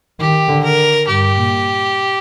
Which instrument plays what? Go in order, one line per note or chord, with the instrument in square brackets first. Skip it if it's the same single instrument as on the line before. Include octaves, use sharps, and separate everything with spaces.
[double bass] D#3 [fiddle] G4
[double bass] D3
[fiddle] A#4
[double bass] G2 [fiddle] G4
[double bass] A#2